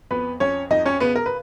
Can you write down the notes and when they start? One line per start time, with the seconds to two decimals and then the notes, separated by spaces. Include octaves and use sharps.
0.11 F2 B3 B4
0.40 F2 C#4 C#5
0.70 F2 D#4 D#5
0.85 C#4 C#5
1.00 C#3 B3 B4
1.16 A#4
1.26 B4